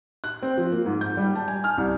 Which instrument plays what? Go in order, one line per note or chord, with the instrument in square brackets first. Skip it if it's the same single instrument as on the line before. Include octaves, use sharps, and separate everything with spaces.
[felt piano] F#6
C4
F3
A#3
G#2
G6
G3
A5
G#5
F6
C2